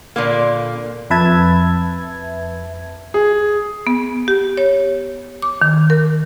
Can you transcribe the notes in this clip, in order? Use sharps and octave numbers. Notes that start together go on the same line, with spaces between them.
A#2 D3 A#3
F2 B4 E5 A5 G#6
G#4
B3
G4
C#5
D6
D#3
A#4